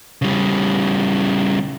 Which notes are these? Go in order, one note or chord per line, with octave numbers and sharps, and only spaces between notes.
C#3 G3